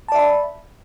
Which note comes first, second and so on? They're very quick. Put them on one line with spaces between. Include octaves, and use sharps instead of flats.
A5 D5 E5 B5